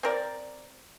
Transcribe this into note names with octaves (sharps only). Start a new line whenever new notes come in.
C4 A#4 D5